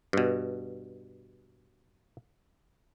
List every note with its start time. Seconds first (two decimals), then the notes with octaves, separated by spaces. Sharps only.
0.13 G2 B2